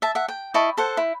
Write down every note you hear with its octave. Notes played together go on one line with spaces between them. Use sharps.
E5 A5
E5 F#5
G5
E4 D#5 A5 C#6
A4 C5 F#5
E4